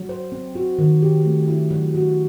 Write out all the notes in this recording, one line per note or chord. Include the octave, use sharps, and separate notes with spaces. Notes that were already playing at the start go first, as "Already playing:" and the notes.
Already playing: F#3
C5
C4
F#4
D#3
G4
A3
E4
F#3
F#4